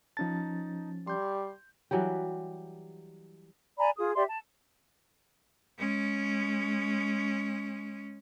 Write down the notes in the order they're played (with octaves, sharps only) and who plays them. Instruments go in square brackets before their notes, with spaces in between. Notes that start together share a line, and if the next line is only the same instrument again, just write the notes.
[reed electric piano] F3 C#4 A6 [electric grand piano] D#4 A5
[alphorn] G3 [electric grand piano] C6 G6
[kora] E3 F#3 G3 G4
[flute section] D5 G#5 A#5 B5
F4 G#4 D#6
G4 D5 E5 C6
A5
[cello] G#3 C#4